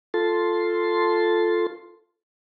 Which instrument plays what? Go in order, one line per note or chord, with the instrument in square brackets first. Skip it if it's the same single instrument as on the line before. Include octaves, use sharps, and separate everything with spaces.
[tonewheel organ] F4 A4 A5 C6